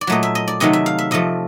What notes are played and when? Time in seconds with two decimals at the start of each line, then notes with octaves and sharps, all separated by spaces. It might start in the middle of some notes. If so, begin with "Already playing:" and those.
0.01 D5
0.07 A#2 F#3 A3 D#5
0.23 E5
0.35 D#5
0.48 D5
0.60 C3 D#3 F#3 A3 D#5
0.73 E5
0.86 F5
0.99 E5
1.11 C3 F3 A3 D#5